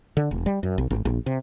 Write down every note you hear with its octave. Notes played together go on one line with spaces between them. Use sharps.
D3
E1
G3
F#2
B1
G#1
A#1
C3